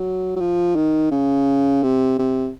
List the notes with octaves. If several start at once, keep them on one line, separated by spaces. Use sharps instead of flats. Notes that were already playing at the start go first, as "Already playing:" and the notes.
Already playing: F#3
F#3
F3
D#3
C#3
C3
C3